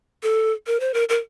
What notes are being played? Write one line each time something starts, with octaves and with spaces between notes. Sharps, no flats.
A4
A#4
C5
A#4
A#4